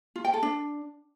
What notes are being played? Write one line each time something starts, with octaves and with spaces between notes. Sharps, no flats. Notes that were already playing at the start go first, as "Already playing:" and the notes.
F4
G5
A4
D4